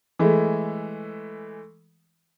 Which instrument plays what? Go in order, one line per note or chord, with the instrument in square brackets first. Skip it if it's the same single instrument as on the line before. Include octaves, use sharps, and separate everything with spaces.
[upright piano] E3 G#3 A3